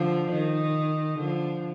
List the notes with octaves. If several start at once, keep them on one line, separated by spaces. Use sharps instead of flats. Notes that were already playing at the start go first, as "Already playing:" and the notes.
Already playing: D3 F3
D#3
D3 F3